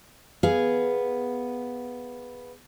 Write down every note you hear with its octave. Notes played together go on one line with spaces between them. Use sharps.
B3 G#4 F5